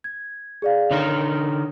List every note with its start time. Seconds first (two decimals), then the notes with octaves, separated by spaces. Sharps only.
0.04 G#6
0.62 G#4 D5 F5
0.91 D3 D#4 A#4 C#5 F6